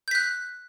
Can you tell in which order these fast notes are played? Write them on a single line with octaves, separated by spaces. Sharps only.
G6 B6 F#6